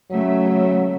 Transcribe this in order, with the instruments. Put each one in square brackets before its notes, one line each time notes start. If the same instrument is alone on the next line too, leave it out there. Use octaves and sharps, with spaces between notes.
[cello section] C#3 A3 E5 [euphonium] F#3